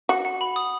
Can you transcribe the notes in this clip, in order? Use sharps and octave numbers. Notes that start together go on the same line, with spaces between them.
F#4 F#5
F#5
B5
D#6